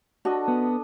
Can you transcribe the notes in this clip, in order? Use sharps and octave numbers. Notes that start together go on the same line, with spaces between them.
D4 F#4 A4 D#5
B3